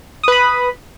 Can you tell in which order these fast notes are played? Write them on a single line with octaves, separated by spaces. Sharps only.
D#6 B4 B5